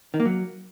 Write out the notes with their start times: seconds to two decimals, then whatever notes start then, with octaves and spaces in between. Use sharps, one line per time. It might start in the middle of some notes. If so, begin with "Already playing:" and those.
0.14 D#3
0.20 A#3
0.25 F#3